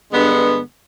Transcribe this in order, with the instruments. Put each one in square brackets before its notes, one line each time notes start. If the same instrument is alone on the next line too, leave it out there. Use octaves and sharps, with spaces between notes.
[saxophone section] G2 D3 G#3 B3